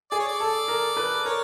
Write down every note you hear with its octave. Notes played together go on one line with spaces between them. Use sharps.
G#4 D5
C#5
D5
A4
A#4
B4
A#4 C#5